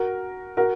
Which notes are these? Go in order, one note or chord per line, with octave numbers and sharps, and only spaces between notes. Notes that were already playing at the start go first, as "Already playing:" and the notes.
Already playing: F#4 A#4
F#4 A#4